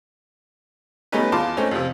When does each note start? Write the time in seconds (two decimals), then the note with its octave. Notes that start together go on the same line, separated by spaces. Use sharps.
1.12 G3 A3 B3 C#4 D#4 B4
1.32 E2 F4 A5 C6 D6
1.57 A3 C4 C#4 D#4
1.71 F2 C3 F3